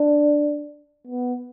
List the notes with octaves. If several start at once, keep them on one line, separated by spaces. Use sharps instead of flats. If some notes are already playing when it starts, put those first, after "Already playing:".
Already playing: D4
B3